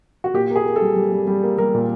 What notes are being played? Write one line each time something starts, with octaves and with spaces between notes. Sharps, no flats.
F#4
A#2 G4
A#3
G#4
A#3
A4
G3
G3
G3
G3
A#3
G3 A#4
A#2